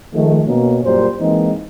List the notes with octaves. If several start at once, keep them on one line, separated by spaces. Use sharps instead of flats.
D#3 F3 G#3 A3
B2 A#3 C#4
F#2 A#2 G3 C5
E3 G#3 A#3 C4 D#4